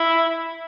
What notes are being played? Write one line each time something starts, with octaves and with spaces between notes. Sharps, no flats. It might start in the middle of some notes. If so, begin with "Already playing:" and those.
Already playing: E4